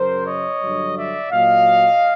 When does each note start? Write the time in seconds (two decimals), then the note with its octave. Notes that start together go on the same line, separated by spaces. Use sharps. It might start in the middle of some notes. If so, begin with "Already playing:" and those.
Already playing: F#2 C#3 F#3 A#4 C5
0.26 C#5 D#5
0.61 G2 D3 F#3
0.96 D5 E5
1.32 A#2 F#3 D#5 F5